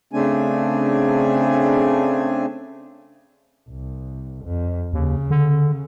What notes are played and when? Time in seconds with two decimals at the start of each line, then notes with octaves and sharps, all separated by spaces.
0.13 C#3 A3 C4 D4 G#5
3.69 C2
4.45 F2
4.93 D#2 C#3
5.31 D3